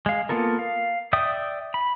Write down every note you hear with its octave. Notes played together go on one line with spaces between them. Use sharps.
G#3 F5
A#3 B3 F4 A4 A#4
F5
D5 E5 G5 D#6
B5